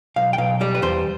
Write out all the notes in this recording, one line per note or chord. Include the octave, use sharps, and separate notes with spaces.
B1 F5
G5
B1 F5
G3 D5
B4
E2 C5